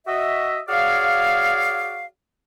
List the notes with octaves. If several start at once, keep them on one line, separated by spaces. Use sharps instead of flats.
F#4 D#5 E5
F#4 G#4 C#5 D5 F5